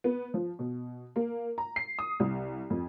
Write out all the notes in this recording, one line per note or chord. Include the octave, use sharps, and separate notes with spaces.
B3
F3
B2
A#3
A#5
C7
D#6
C2
F2